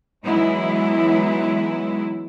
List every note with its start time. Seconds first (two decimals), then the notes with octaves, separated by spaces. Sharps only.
0.24 E3 F#3 G#3 B3 D#4 E4